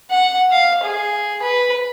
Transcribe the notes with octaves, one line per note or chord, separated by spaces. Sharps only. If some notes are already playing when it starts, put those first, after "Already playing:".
F#5
F5
G#4
B4